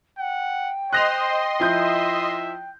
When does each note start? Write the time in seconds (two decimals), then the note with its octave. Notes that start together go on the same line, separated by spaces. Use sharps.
0.18 F#5 G5
0.93 C5 D#5 C6 F#6 A#6 F7
1.60 F3 E4 E5 G6